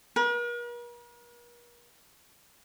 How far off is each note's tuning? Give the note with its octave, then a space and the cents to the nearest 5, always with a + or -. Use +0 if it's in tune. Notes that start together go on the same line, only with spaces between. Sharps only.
A#4 +45